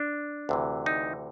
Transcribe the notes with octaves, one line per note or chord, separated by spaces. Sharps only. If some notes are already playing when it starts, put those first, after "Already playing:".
Already playing: D4
D2 C3 E3
D#4